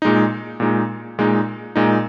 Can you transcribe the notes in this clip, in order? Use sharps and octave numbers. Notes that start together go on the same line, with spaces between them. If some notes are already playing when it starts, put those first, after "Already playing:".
A#2 G#3 D#4
A#2 G#3 D#4
A#2 G#3 D#4
A#2 G#3 D#4